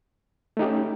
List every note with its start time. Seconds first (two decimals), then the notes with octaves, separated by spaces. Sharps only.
0.57 A3
0.59 D#4
0.62 G4
0.64 C#4